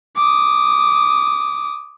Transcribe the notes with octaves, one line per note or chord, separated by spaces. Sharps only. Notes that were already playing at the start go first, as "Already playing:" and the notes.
D6 D#6